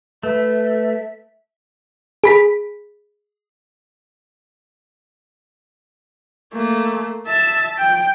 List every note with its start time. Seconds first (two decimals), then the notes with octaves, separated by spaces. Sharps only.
0.23 A3 B4 E5
2.24 G#4 B5 B6
6.54 A3 A#3
7.27 E5 A5
7.78 G5